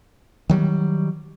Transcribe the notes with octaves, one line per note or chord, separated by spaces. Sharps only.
D#3 F#3 G3